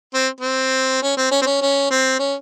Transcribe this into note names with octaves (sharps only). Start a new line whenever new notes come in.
C4
C4
C#4
C4
C#4
C4
C#4
C#4
C4
C#4